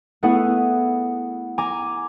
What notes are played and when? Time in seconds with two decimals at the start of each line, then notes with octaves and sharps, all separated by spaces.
0.23 A3 B3 E4 G#4 F#5
1.58 G#5 A#5 D6